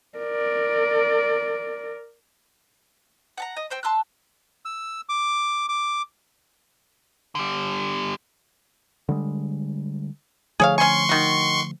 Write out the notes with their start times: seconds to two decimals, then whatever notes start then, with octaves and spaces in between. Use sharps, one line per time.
0.18 A#4 D5
3.38 F#5 A5 A#5
3.57 D#5
3.70 C4 C5 G5
3.83 A5 C6 E6 F#6
4.65 E6
5.09 D6
5.69 D6
7.35 D3 G3
9.09 D3 G3 G#3
10.60 D3 F3 A3 G#4 C#5 F5
10.78 C#4 G#5 C6 C#6
11.09 D#3 F#4